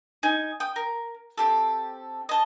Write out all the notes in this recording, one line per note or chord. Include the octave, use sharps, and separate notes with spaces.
D#4 G#5
G5 D#6
A#4
C4 G4 A4
D#5 A5